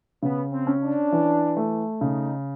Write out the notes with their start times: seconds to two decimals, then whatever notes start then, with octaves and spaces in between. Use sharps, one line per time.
0.23 C#3 B3
0.52 C4
0.67 C#4
0.82 D4
1.12 E3
1.57 A3
2.01 C#3 D#4